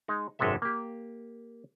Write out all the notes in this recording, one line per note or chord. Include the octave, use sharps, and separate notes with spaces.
G#3 D#4
G#1 F#2 C3 G#3 A4 E5
A#3 G4